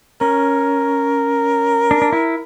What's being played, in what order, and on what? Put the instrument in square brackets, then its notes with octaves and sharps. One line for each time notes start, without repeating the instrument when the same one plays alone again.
[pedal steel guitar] C#4 [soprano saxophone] A#4
[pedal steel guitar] D4
D4
E4